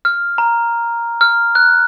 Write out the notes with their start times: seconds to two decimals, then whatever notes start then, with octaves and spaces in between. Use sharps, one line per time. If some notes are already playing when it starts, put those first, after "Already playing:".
0.05 F6
0.38 A#5
1.21 F6
1.55 F#6